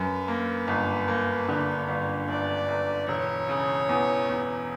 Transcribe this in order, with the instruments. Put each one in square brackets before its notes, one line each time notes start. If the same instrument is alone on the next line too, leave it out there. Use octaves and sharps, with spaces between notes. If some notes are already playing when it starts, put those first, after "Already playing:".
Already playing: [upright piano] F#2 [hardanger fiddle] B4
[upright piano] A#3
G1
A#3
D3
G1
[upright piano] G1 [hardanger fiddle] D5
[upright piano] G1
[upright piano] E1 [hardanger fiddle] C#5
[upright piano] C#3
E2
E2